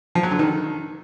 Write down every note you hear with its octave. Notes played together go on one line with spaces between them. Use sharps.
F3
F#3
D3
D#3